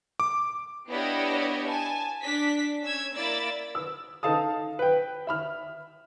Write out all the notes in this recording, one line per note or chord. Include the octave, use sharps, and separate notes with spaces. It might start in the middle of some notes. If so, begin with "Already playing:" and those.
D6
B3 D4 E4 G4 C#5 D#5
G#5 A5
D4 B6
C#4 E6 G#6
A#3 E4 D5 E6 A6
E6
D#4 A4 F5 A5 D#6
B4 G5
E5 B5 F6